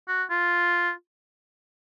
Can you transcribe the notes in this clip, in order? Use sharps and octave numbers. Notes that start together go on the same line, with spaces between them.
F#4
F4